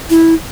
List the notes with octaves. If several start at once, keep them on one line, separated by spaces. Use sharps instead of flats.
E4